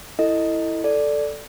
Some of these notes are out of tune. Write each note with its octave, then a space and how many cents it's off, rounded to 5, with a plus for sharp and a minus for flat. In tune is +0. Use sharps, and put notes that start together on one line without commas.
E4 +0 A4 +20 D#5 +0
A4 +0 D5 +0